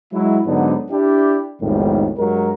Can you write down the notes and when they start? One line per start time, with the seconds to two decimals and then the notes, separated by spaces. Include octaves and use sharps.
0.13 F#3 G#3 E4
0.46 G#2 D3 F#3 B3 D4 D#4
0.91 D4 E4 G4
1.62 B1 F2 A2 D#3 G3 G#3
2.18 G2 F#3 G#3 A#4